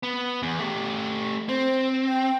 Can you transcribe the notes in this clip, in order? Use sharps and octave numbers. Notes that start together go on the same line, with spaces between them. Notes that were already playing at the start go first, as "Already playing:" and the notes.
B3
E2
A3 G4
C4 C5
G5